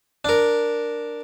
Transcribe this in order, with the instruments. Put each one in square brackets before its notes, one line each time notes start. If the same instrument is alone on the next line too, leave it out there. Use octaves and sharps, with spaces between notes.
[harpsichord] D4 A#4